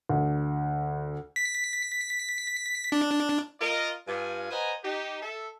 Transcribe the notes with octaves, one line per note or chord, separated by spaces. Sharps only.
D2
B6
D4
F4 A#4 D#5
G2 F4 G#5
B4 C5 D#5 F#5 G#5 A#5
D#4 G4
A4 E5